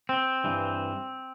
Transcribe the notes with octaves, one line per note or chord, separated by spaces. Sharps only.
C4
G2 E3